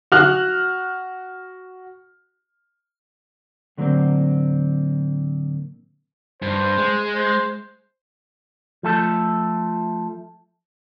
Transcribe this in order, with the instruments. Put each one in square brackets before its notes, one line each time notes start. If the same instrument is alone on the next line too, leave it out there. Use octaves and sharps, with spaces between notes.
[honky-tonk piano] F#4 F6 F#6
[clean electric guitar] A2 D3 F#3 A3 A#3 C4
[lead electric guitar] G2 [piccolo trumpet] C5
[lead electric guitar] G#3
[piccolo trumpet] C5
[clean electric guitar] F3 A3 A4